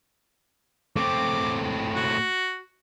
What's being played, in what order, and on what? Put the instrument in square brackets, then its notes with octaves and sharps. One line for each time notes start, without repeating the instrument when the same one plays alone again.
[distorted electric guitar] A2 C4 [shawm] D6
[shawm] F#4